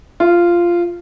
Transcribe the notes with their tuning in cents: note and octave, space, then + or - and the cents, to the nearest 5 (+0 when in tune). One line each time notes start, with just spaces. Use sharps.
F4 -10